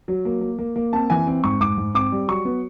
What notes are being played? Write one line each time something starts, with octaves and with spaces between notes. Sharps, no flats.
F#3
A#3
A#3
A#3
A#3
C4 A5
E3 G#5
C4
G#2 C#6
G#2 D6
G#2
C4 D6
G3
F#3 C#6
B3